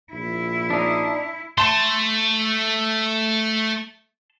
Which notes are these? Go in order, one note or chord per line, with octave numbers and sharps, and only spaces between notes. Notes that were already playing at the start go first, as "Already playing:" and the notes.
A#1 E4
D4 D#4
A3 A5 C6